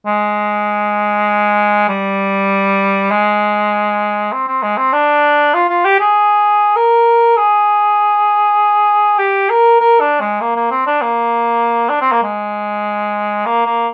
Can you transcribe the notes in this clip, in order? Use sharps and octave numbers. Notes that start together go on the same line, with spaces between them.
G#3
G3
G#3
C4
C4
G#3
C4
D4
F4
F4
G4
G#4
A#4
G#4
G4
A#4
A#4
D4
G#3
A#3
A#3
C4
D4
A#3
D4
C4
A#3
G#3
A#3
A#3